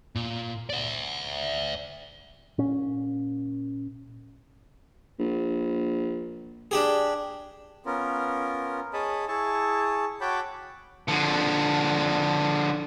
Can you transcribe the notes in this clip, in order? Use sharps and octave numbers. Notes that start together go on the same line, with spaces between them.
A#2
D5 E5
A#2 C#4
A#1
D4 G4 G#4
B3 C#4 F4 A#4
G#4 C#5 D#5 A5 B5
E4 G#4 A5 C#6
F#4 C#5 G5 A5 B5 D6
D3 F3